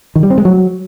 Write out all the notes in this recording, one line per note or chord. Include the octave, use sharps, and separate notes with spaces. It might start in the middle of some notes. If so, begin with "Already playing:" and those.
D#3
G3
C4
G#3
F#3